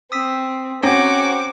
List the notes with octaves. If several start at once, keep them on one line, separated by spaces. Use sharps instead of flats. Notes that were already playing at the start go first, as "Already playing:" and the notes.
C4 D#6 E6 B6
C4 C#4 F#4 C#5 A#5 D6 A#6